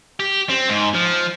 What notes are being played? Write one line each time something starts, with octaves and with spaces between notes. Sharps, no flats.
G4
C4
G#2
F3